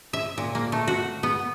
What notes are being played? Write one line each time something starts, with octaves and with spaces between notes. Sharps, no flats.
E5
A#2
A#3
A3
F#4
B3